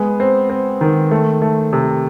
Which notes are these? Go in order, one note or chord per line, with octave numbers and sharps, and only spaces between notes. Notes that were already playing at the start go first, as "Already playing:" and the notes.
Already playing: G#3 B3
C4
C4
D#3
A3
A3
C3